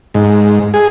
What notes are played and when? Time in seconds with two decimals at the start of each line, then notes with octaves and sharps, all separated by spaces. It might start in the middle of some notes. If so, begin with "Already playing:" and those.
0.14 G#2
0.74 G#4